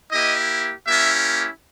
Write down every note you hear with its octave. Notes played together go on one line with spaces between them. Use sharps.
A#3 E4 G4 D#5
A#3 C#4 E4 G4 E5